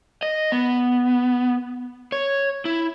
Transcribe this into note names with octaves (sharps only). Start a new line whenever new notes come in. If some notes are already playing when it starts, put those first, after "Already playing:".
D#5
B3
C#5
E4